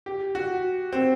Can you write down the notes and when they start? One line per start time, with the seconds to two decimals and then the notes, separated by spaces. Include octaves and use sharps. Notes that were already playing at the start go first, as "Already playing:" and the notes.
0.06 G4
0.35 F#4
0.93 C4